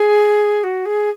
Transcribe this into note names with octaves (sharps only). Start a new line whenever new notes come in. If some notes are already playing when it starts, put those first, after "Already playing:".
Already playing: G#4
F#4
G#4